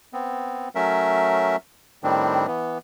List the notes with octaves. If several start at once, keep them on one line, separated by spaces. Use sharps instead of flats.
B3 C4
F#3 A3 C#4 A#4 E5
A2 D#3 G3 C4 D4
E3 B3